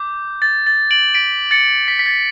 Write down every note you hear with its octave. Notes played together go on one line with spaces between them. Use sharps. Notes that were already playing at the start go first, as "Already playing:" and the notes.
Already playing: D6 G6
A6
A6
D7 F#7
B6 D7
A6 C#7
B6
B6
A6